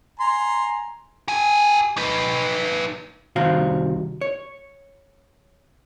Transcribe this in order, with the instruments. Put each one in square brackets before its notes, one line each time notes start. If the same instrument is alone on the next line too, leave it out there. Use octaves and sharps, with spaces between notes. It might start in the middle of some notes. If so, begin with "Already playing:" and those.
[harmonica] G#5 A#5 C6
[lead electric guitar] G4 G#5
D#4 B4
[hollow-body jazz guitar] C2 D#3 F#4 C5 F5
C#5